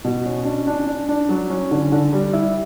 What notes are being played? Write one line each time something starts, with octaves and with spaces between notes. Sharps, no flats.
B2
C#4
D4
D4
D4
D4
F#3
C#4
D3
D3
G3
E4